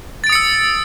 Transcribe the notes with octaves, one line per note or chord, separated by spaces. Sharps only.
D#6 E6 A6 C#7 D7